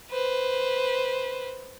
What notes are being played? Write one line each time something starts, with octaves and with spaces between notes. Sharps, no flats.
B4 C5